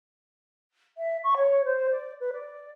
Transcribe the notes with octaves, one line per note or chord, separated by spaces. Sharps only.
E5
C#6
C#5
C5
D5
B4
D5